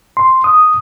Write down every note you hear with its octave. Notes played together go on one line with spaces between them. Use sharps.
C6
D#6